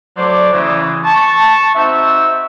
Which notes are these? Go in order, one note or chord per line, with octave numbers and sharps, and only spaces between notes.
F#3 A3 C5 D5
C#3 E3
A5 C#6
C4 D#4 F#4 E5